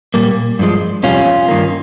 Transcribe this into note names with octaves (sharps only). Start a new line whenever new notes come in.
A#2 G3 A#3
G2 F3 G#3
F2 C3 G3 C#4 F4
G2 D#3 A#3